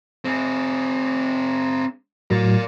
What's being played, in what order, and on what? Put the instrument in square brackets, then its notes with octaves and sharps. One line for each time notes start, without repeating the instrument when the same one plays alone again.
[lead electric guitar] C4 G#4
[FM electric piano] A2 F#3 [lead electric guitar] A#4 D5